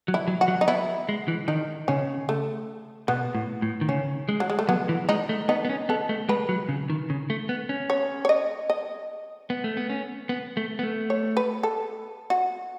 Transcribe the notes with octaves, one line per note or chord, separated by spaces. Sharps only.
F#3
E4
F#3
F#4
F#3
D#4
B3 E4
G#3
E3
D#3 D#4
C#3 C#4
A3
B2 B3
A2
A2
D#3
C#3 C#4
G#3
F#3
G#3
A3
F#3 B3
E3
G#3 D#4
A3
B3 D#4
B3
C#4
B3 A4
A3
G#3 B4
F#3
C#3
D#3
C#3
A3
B3
C#4
C#5
C#5
D#5
D#5
B3
A3
B3
C#4
B3
A3
B3
A3
C#5
B4
A4
F#4